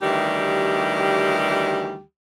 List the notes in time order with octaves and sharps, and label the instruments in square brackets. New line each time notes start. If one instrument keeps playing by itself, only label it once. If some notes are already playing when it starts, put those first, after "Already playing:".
[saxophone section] D2 D#3 E3 G3 G4